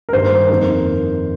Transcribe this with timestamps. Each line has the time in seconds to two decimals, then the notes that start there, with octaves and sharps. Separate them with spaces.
0.09 A#4
0.12 G2 D#3 A#3 C5
0.49 F2 D#3 A#3 D#4